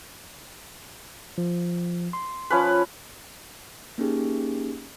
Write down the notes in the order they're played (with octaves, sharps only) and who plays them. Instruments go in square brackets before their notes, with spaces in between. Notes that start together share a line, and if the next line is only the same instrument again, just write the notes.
[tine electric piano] F3
C6
[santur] F3 C#4 B4
[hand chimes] A#3 C#4 D#4 G4 G#4